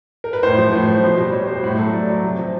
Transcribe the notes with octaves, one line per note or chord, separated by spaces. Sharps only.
A#4
B4
A2 C5
F3
A2
F3
B2 C5
G3
B2 C#5
G3 C5
A2
F#3 A4
A2 D5
F#3
C3
F3